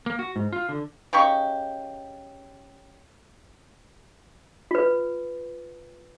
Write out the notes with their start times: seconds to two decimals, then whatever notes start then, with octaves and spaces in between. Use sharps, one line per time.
0.06 A#3
0.19 F#4
0.36 G#2
0.53 F4
0.69 D3
1.13 C#3 D#4 G4 C#6
4.71 F4 B4